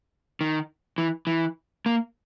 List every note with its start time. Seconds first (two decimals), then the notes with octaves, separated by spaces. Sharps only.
0.41 D#3
0.98 E3
1.27 E3
1.86 A#3